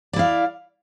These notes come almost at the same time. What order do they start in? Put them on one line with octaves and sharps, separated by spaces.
D5 E4 F5